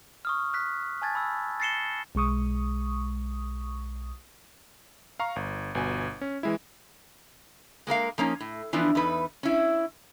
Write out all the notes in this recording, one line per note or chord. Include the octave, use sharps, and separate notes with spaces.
C#6 D#6 F6
F6 F#6 B6
G#5 A5 G#6 A6
B5 E6
A6 A#6 C7 C#7 E7 G7
B1 G#3 C#6 D#6
F5 A#5 C#6
G1
G1 B2 G#5
C#4
E3 G#3 E4
G#3 A#3 A#4 F5
F3 A#3 C#4 D#4
A2
E3 F3 B3 D4
E2 D#4 B4
C#4 E4